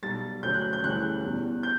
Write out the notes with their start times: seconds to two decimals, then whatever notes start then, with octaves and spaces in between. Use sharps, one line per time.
0.03 B1 B2 G3 A6
0.43 D2 C#3 F#3 G6
0.54 F#6
0.73 G6
0.84 D2 C#3 E3 G3 F#6
1.24 E2 B2 G3
1.63 G6